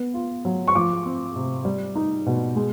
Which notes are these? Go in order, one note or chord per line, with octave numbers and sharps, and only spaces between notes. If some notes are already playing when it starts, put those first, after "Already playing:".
Already playing: B3
F4
F#3
C#6
F3 D6
C4
C3
G3
D#4
B2
G#3